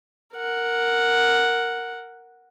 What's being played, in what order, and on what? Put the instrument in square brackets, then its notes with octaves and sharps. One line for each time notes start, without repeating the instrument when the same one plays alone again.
[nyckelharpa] A#4 F#5